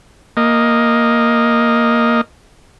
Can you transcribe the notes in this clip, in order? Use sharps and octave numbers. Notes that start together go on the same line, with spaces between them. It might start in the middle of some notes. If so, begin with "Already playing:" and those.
A#3 D#5